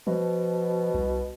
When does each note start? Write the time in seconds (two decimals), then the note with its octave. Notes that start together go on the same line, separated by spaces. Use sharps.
0.07 B2 F3
0.94 C2